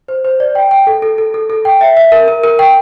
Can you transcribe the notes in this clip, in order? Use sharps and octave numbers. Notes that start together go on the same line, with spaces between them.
C5
C5
D5
G5
G5
A4
A4
A4
A4
A4
G5
E5
E5
A#4
A#4
A#4
G5